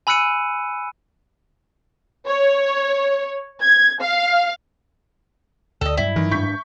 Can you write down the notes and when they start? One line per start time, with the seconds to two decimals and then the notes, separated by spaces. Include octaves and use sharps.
0.07 G#5 B5 E6 F#6 C#7 D#7
2.26 C#5
3.62 G#6
4.02 F5
5.81 D2 A4 D#5
5.97 G2 F#3 E4
6.16 D#3 E3
6.31 G#2 D4 C#6 G6 B6